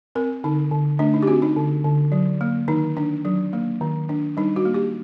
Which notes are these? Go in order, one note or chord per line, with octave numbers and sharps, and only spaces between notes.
C4 A#4
D3 D#4
D3
A3 D4
D#4
G4
C4 F#4
D#4
D3
D3
F#3
A#3
D#3 D#4
D4
F#3
A#3
D#3
D4
G3 D#4
F#4
A#3
G4